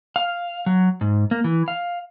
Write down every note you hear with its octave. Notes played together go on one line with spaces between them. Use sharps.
F5
F#3
G#2
A#3
E3
F5